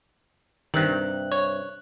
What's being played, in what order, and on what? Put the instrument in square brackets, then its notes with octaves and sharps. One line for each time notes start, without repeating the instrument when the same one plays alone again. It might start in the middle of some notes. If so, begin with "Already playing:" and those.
[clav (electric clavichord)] G2 C3 [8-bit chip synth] D#3 [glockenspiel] F#6 F#7
[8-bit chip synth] C#5